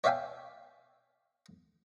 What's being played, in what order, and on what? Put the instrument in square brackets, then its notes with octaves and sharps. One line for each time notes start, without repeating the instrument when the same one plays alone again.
[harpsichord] C#5 D5 E5 F5 G5 G#5